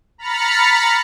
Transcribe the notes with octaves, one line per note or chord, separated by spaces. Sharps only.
A#5 B5 F6 A6 B6 C#7